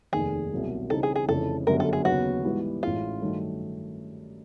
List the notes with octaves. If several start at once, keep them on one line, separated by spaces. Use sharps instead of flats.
F1 D#2 D#3 G#4
C2 B2 F#3 A#3
C#3 E3 G3 C4 D#4 A4
G#4
G#4
F1 F2 C#3 E3 A4
G1 F#2 D3 G3 A#4
A4
G#4
D#2 C#3 F#3 B3 F#4
G#2 E3 G3 B3
A1 G#2 E3 G#3 C#4 F4
G2 D#3 F#3 A3